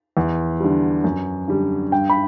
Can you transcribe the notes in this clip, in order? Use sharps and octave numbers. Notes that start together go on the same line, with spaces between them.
E2
D3 G3
F#2
D3 G3
G2 G5
B5